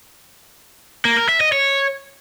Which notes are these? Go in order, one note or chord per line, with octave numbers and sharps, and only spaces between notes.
A#3
A#4
E5
D#5
C#5